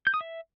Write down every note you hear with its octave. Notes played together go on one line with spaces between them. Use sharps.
G6
D#6
E5